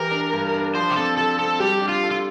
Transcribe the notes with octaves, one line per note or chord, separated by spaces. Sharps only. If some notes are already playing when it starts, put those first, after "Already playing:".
Already playing: E3 G4 A#4
D4
G2
D4
F3 C5
G4
C4 A4
F3 A4
C4 A4
G3 G4
D4
F4
A4
F4